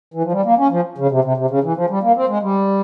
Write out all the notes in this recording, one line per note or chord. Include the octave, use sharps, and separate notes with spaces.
E3
F3
G3
A#3
C#4
F3
C#3
C3
C3
C3
C#3
E3
F3
G3
A#3
C4
G#3
G3